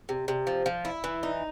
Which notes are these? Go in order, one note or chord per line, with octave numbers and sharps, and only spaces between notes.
C3
C3
F3
F3
E4
E3
D#4